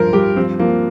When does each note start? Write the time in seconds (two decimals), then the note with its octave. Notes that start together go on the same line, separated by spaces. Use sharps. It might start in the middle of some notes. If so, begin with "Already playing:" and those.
Already playing: G2 F3 A#4 C5
0.13 G2 G4
0.37 F3 C4
0.59 F3 A#3